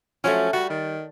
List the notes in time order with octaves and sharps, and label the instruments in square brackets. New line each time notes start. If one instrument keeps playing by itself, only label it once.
[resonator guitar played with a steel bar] F3 F#3 A3 [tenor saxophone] C#4
[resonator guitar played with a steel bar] G3 [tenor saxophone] F#4
[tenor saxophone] D#3